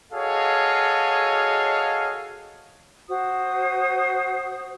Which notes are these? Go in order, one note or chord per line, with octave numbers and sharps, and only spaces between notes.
F#4 G#4 A4 C#5 D#5 F5
F#4 C5 D#6